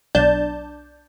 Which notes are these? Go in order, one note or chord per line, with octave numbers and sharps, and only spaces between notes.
B1 D4 A5 G6